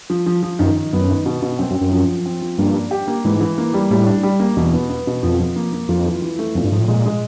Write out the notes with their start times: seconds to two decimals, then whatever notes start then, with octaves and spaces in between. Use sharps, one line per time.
0.10 F3
0.26 F3
0.43 F3
0.59 F#2 D#3
0.76 D#3
0.93 F#2 B3
1.09 D#3
1.26 B2
1.42 B2
1.59 F#2 C4
1.71 F#2
1.75 C4
1.81 F#2
1.92 F3
2.08 F3
2.26 C4
2.42 F3
2.58 G2 A#3
2.75 D4
2.91 G4
3.08 A#3
3.25 G#2 E3
3.41 E3
3.58 A#3
3.74 G3
3.90 A2 G3
4.07 D4
4.23 G3
4.40 A#3
4.57 E2 B2
4.73 B3
4.90 B3
5.07 B2
5.23 F2 F3
5.39 F3
5.56 A#3
5.73 A#3
5.89 F2 F4
6.06 E3
6.22 E3
6.39 A3
6.55 F2 A#2
6.63 G2
6.72 G#2 F3
6.80 A2
6.88 A#2 G#3
7.06 G#3